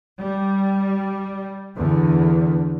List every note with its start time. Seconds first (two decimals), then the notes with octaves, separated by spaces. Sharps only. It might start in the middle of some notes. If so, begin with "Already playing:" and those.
0.19 G3
1.76 E2 D3